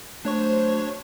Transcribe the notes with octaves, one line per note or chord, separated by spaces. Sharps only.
F#3 A3 D4 C5 C#5 C#6